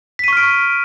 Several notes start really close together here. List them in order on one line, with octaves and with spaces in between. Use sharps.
B6 D#7 C#6 F6 D7